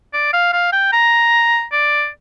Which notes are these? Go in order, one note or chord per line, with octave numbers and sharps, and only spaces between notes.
D5
F5
F5
G5
A#5
D5